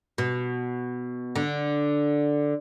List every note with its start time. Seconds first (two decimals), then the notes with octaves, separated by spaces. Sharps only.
0.18 B2
1.36 D3